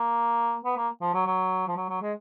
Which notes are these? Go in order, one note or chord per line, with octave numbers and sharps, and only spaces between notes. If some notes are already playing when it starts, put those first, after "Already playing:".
Already playing: A#3
B3
A#3
F3
F#3
F#3
F3
F#3
F#3
G#3